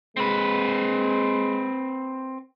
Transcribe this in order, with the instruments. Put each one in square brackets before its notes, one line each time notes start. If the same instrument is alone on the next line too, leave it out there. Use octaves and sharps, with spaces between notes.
[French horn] G#3 [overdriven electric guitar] C4 B4